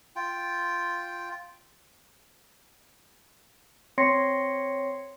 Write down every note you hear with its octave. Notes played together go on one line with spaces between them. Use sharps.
F4 G5
C4 C#5 C6 A#6 C7 C#7